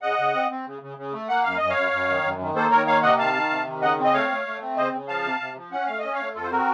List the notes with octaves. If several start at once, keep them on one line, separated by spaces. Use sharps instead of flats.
C#3 D#5 F#5
C#3
C4
C4
C#3
C#3
C#3
A3
A#3 F#5
F#2 F5
F#2 D#5
C#5 F5
F#2
F#2
D#3
F#2
D#3
A#3 A4 C5
D#3 A#4 C#5
A#3 C#5 F5
C3 D#5 F#5
D#3 F5 A5
D#3
C3
D#3
C#3 D#5 F#5
C4
D#5
A3 C#5 F5
A3
A3
C4
C#3 C5 D#5
C#3
F3 F5 A5
C3
C3
F3
C#4 F#5
A3 F5
C#4 D#5
C#5 F5
A3
F2 F4 A4
C5
C4 F#4 A#4